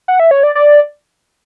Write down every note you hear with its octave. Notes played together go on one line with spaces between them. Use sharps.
F#5
E5
C#5
D5
D5